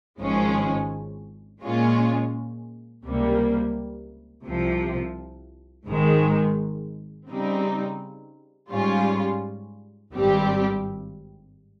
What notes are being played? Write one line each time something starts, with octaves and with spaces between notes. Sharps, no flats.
G#1 G#2 F3 G#3 C#4
A#2 G#3 C#4 F4
C#2 C3 G3 A#3
C2 C3 F3
G#1 G#2 D#3 G#3
C#3 G3 C4 D#4
G#2 G3 C#4 F4
G#1 G2 G3 C4 G4